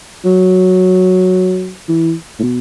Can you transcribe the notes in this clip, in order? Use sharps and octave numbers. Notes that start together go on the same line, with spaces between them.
F#3
E3
A2
B2